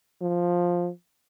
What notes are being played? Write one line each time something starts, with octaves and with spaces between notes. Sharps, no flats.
F3